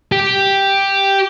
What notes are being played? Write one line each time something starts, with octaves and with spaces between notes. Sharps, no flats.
G4